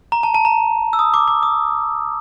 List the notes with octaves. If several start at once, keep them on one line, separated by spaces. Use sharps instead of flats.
A#5
A5
A5
A#5
E6
D#6
D6
D6
D#6